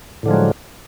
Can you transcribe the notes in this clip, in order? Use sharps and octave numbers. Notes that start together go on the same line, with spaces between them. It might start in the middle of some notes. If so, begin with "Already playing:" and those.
A2 D3 F3 F#3 G#3